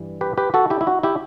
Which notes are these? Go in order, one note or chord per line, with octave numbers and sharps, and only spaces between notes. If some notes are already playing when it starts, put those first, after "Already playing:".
Already playing: G2 E3 G3
G4 B4
G4 B4
F#4 A4
E4 G4
E4
F#4
E4 G4